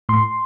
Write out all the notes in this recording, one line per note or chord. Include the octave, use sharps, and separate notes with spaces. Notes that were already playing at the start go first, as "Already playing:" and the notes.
A2 C6